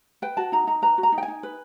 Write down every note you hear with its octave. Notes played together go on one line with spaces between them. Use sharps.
B4 G5
F#4 A5
D#4 A#5
D#4 A#5
B4 A#5
F#4
A#5
D#4
G5
G#5
D#4
B4